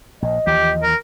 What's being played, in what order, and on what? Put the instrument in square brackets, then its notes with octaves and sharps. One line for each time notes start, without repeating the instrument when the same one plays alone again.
[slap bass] A#1 [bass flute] D#5
[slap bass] D#2 E3 F3 [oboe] G4
[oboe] A#4